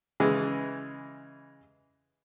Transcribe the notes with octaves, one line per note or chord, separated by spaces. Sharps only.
C#3 E3 G#3